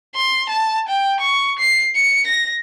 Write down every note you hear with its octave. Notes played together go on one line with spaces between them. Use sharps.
C6
A5
G5
C#6
C7
C#7
A#6